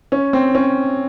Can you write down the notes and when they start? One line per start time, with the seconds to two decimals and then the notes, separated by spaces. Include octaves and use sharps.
0.12 C#4
0.33 C4
0.55 C#4